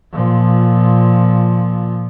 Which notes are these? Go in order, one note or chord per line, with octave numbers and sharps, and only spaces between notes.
A#2 F3